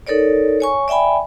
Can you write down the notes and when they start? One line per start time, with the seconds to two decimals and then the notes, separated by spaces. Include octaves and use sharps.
0.07 D#4 A4 A#4 C#5 D5
0.60 C#5 G#5 C#6
0.88 D5 E5 G5 G#5 B5